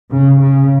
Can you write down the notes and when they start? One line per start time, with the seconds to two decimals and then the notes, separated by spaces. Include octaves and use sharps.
0.12 C#3
0.41 C#3